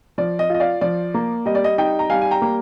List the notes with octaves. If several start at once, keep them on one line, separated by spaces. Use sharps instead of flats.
F3 D5
D#5
F4 D#5
D5 F5
F3 D5
A#3
G3 D#5
D5
D#5
D#4 D#5 G5
A#5
G3 F5 G#5
G#5
G5 A#5
A#3